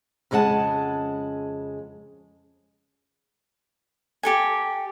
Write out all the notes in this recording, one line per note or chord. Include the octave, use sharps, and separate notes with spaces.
F2 C#3 G#3 C4 F#5 A5
G4 A4 G#5